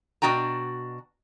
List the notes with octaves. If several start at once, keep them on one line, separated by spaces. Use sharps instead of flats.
B2 D4 F#4 G5 A#5